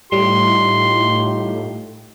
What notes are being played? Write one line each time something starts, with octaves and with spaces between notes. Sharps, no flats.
A2 G3 D#4 F4 G4 C6